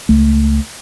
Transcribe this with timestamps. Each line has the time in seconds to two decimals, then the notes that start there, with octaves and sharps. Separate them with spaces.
0.09 C#2 A3